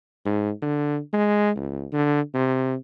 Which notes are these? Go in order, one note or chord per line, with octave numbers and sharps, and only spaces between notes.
G#2
D3
G#3
C#2
D3
C3